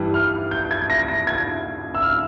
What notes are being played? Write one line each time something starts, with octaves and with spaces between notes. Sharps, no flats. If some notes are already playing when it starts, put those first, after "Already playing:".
Already playing: G2 E3 G3
F6
G6
G#6
A#6
A#6
G#6
E6
F6